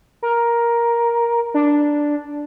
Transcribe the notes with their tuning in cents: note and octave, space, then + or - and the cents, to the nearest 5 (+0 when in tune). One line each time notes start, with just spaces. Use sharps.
A#4 +10
D4 +0